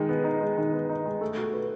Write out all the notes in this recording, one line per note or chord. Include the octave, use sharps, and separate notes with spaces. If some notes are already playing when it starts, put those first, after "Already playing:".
Already playing: D#3 G#3 D#4
B3
D#4
G#3
D#3
B3
D#4
G#3
A3
F#4
B4